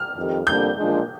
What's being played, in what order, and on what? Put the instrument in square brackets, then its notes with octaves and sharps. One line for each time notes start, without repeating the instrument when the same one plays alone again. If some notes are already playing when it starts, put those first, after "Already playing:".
Already playing: [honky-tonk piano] F6
[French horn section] F2 D#3 G3
[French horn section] F2 D3 G3 A#3 D4 [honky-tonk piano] G6
[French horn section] A#2 F3 G#3 D4